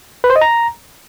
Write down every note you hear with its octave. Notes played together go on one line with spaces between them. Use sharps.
B4
C5
D#5
A#5